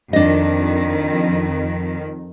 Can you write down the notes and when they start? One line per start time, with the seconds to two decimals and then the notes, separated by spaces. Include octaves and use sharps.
0.13 F2 D#3 D4 D#5